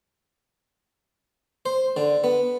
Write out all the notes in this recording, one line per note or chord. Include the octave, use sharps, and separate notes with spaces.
C5
D3
B3